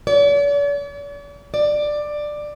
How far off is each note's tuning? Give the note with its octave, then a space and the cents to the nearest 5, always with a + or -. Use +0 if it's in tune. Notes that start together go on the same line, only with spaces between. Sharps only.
D5 -45
D5 +10